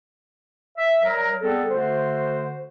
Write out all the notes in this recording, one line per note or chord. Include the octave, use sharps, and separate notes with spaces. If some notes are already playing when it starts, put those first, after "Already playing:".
E5
F#3 G3 A#4
G3 B3 C4 G#4 A4
D3 A3 F#4 C5